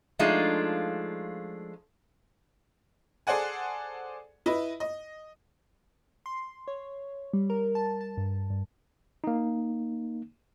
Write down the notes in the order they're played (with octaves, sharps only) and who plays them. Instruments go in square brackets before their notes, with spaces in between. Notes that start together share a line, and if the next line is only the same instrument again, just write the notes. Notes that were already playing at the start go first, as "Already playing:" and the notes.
[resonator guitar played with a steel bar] F3 G#3 A3 D4 D#4 F4
[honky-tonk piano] G#4 A4 C5 D5 F#5 G#5
E4 B4 D#5
D#5
[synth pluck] C6
C#5
G3
A#4
A5
A5
G2
G2
[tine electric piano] A#3 D#4